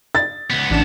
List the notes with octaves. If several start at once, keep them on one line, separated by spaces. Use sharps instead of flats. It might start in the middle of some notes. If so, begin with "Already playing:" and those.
A6
C#2 B3
A1 D4 E7